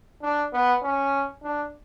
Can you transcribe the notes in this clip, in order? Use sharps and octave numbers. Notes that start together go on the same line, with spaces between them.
D4
B3
C#4
D4